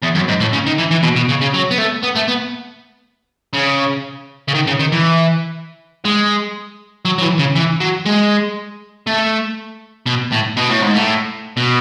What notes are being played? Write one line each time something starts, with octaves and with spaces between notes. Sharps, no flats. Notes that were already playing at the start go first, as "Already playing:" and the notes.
E2
F#2
G#2
A2
C#3
D#3
E3
E3
B2
B2
C#3
C#3
F#3
B3
A3
B3
A3
B3
C#3
C#3
D#3
C#3
D#3
E3
G#3
F#3
F#3
E3
C#3
E3
F#3
G#3
A3
B2
A2
B2
A2
G#2
A2
B2